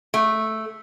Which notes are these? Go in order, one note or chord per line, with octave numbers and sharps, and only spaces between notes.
A3